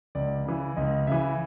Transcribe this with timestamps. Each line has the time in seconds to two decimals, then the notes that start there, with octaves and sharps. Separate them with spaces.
0.15 C#2 D5
0.45 C#3 E3
0.77 C#2 D#5
1.07 C#3 E3 E5